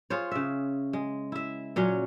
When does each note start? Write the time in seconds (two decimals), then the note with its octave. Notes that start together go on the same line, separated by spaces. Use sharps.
0.10 F4 G#4 C5 C#5
0.31 C#3 E5
0.93 G#3
1.32 E4 E5
1.76 A#2 F#3 C#4 C#5